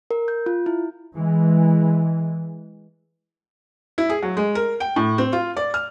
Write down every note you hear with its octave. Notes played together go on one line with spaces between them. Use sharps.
A#4
G6
F4
E4
E3 G#3
E4
G#4
F#3
G#3
A#4
G5
A2
C4
F4
D5
F6